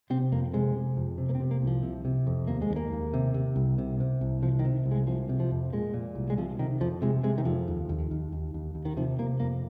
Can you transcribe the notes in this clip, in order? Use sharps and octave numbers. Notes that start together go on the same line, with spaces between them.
C3 C4
F2 A#3
C3 G#3
C3
F2
C3
A#3
C4
C3
A#3
C2
F3
C3
C3
F2
D#2 A#3
G#3
D#2
A#3
D#2
C3
C3
C2
C3
C3
C2
C3 F3
D#3
C3
C2
G#3
C3 F3
C3
F3
F2
A#2 G#3
A#2
C2
G#3
C3 F3
C3 D#3
F2 F3
C3 G#3
C3 G#3
D#3
F2 F3
D#2
D#2
D#2
D#2
D#2
D#2
D#3
C3 F3
C3 A#3
F2 A#3